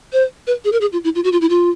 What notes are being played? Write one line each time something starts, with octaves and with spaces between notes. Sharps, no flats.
C5
B4
G#4
A#4
G#4
F4
E4
F4
F#4
F4
E4
F4